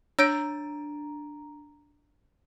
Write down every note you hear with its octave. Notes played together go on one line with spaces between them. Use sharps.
D4 C#5 A#5 E6 G6 D7